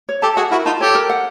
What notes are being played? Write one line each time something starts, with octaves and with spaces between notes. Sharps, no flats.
C#5
G4 A4 A5
F#4 G#4 F#5
E4 F#4 A#4
D#4 F4 A5
G4 A4 C#5
A#4
F#5